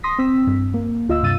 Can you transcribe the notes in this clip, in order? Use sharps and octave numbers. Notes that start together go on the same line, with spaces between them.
C6 D#6 A#6 B6
C4 E6 B6
G2
A#3
D2 F4 D#5 E6
G2 C3 F5 E6 A6 D#7